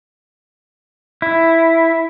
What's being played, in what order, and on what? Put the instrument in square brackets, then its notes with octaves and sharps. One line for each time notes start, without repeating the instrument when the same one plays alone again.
[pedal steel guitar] E4